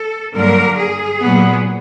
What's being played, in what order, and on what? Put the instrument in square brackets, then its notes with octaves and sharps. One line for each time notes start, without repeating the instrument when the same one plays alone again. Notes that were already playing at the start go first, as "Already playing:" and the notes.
Already playing: [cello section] A4
G2 D3 F#3 A#3 A#4
G#4
A#2 F#3 B3